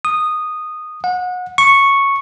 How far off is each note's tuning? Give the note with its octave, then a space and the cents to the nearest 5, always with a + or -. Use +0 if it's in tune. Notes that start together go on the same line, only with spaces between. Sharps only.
D#6 -10
F#5 -30
C#6 -5